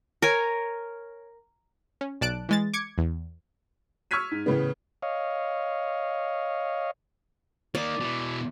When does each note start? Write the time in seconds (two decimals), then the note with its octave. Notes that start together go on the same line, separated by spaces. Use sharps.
0.22 A#4 C#5 G#5
2.01 C#4
2.21 B1 D5 A5 F#6 D7
2.49 E3 G#3 A6
2.74 D6 G#6 C#7
2.98 E2
4.11 C#6 E6 F6 G#6 B6 D#7
4.31 G#2
4.46 A2 C#3 E3 B3
5.02 C#5 D#5 F5
7.75 A#3 D#4 D5
8.00 B2 E3